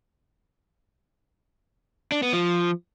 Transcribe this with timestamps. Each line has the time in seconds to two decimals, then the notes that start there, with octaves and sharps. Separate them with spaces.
2.12 D4
2.23 B3
2.33 F3